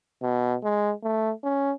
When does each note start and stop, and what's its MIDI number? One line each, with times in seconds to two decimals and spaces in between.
0.22 0.55 47
0.63 0.92 56
1.04 1.31 57
1.44 1.72 61